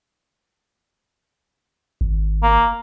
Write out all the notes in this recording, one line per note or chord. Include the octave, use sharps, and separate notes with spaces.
G#1
A#3